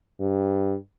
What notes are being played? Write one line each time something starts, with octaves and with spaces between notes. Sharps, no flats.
G2